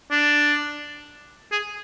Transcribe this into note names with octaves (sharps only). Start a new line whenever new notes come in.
D4
G#4